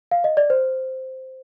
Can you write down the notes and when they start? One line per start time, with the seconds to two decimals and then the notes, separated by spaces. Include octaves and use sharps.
0.11 F5
0.24 D#5
0.37 D5
0.50 C5